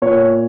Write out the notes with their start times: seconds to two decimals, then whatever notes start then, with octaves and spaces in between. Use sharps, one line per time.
0.02 A#2 C#5